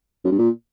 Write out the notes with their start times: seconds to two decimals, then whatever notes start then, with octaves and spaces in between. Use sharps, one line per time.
0.25 F#2
0.31 G2
0.38 A#2